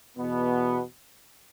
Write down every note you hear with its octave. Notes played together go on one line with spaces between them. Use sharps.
E2 B2 B3